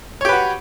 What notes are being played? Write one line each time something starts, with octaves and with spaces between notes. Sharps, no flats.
F#4 G4 B4 C#5